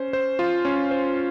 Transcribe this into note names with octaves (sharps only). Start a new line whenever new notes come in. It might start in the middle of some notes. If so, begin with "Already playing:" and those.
Already playing: C#4 C5
C5
F4
C#4
C5